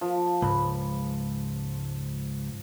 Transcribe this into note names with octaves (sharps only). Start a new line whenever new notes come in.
F3
C#2 G#2 B5